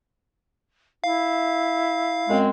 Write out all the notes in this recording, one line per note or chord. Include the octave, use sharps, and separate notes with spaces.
E4 F5
F#2 G#3 C4